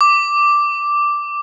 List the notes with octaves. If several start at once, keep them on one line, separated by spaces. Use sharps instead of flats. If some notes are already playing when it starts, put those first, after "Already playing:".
D6